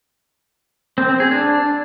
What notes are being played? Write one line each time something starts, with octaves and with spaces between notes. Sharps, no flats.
C4
C4
G#4
D4